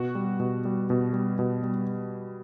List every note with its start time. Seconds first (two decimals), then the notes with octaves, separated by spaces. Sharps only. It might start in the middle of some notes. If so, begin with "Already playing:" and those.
Already playing: B2 F#4
0.15 G3
0.40 B2
0.65 G3
0.90 B2
1.13 G3
1.39 B2
1.63 G3